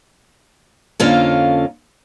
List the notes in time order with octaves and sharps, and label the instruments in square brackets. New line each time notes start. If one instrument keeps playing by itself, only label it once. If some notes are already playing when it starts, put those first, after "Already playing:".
[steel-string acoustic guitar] F2 D3 A#3 C#4 F4 F5